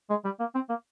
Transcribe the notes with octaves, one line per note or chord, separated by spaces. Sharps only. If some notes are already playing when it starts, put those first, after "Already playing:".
G#3
G3
A#3
C4
A#3